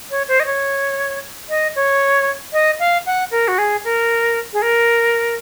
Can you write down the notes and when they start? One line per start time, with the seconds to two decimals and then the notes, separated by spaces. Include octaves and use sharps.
0.11 C#5
0.28 C5
0.40 D#5
0.46 C#5
1.49 D#5
1.76 C#5
2.53 D#5
2.80 F5
3.06 F#5
3.31 A#4
3.48 F#4
3.58 G#4
3.84 A#4
4.53 G#4
4.62 A#4